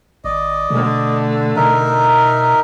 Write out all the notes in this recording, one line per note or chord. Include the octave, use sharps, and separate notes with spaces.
G#1 D5 D#5
B2 D3 A3
B2 D#4 A#4 E5